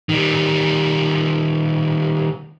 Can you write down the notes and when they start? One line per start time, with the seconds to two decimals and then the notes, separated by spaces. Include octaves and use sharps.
0.09 D#3 G3